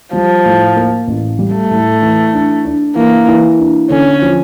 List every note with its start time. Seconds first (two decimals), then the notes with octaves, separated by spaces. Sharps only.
0.13 F3 G3
0.45 A2
0.76 A#3
1.08 A1
1.39 G3
1.55 A3
1.71 A2
2.02 E3
2.34 D4
2.65 D4
2.96 E3 A#3
3.28 E3
3.59 D4
3.90 D3 C#4
4.22 F3